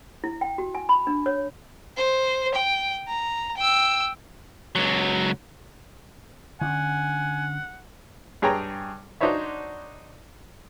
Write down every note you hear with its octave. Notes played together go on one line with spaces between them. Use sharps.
E4
G5
F#4
G#5
B5
D4
C#5
C5
G5
A#5
G5 E6
C#2 F#3
D3 C#4 F#5 G#5
G2 G#4 C#5 G5 A#5
D4 D#4 F#4 C5 C#5 E5